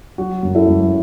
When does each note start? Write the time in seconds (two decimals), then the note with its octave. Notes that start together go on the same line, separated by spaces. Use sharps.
0.18 F#3 F#4
0.43 F#2
0.55 E4 A4
0.68 F#2